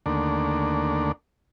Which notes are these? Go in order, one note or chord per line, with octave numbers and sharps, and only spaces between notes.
D#2 D3 A3 A#3 D4